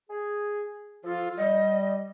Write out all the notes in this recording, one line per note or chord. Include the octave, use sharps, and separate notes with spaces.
G#4
F3 F4 A4
G3 D#5